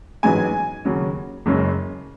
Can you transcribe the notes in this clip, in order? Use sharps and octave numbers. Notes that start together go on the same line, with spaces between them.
A1 G#2 F#3 B3 G#5
D#2 C#3 F#3 C#4
F#1 F#2 C#3 G#3 C#4